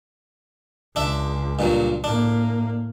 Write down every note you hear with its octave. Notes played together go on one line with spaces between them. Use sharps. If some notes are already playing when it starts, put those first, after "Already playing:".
C#2 D4 E5
G2 A#2 F#3
A2 A#3 D4